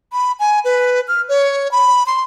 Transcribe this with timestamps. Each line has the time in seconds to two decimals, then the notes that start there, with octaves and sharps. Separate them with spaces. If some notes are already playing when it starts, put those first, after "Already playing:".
0.12 B5
0.40 G#5
0.65 B4
1.08 F6
1.29 C#5
1.72 B5
2.07 C6